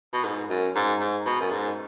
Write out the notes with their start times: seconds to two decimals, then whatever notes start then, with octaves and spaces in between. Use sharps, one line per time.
0.13 B2
0.24 G#2
0.49 F#2
0.76 G#2
1.00 G#2
1.26 B2
1.41 F#2
1.51 G#2